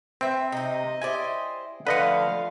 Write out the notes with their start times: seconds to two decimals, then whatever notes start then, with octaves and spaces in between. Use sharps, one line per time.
0.21 C4 B4 E5
0.52 C3 D#4 D#5
1.02 E4 G4 C5 D5 G#5
1.87 D3 F3 A3 B4 D#5 F5 F#5